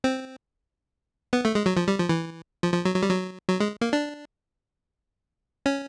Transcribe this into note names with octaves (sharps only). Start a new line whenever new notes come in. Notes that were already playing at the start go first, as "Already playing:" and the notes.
C4
B3
A3
G#3
F#3
F3
G3
F3
E3
F3
F3
F#3
F#3
G3
F#3
F#3
G#3
A#3
D4
C#4